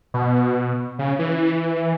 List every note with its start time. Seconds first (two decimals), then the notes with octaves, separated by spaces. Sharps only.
0.14 B2
0.99 C#3
1.19 E3